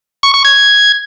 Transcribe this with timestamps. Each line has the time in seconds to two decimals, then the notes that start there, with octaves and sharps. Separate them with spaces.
0.23 C#6
0.34 C#6
0.45 G#6